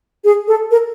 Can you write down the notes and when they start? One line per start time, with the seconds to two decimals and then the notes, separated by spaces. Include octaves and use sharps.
0.24 G#4
0.48 A4
0.71 A#4